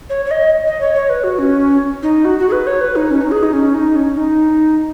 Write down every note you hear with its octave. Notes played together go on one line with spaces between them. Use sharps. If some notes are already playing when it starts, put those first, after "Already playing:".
C#5
C#5
D#5
D#5
C#5
C#5
B4
F#4
C#4
D#4
F#4
F#4
G#4
B4
C#5
B4
D#4
C#4
D#4
G#4
D#4
C#4
D#4
C#4
D#4